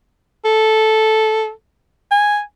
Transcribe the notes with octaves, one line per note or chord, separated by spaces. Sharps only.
A4
G#5